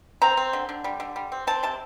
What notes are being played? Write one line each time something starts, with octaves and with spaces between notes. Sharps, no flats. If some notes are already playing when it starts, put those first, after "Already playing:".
C4 A#5
C4
D3
D3
G3
D3
G3
C4
C4 A5
C3 A5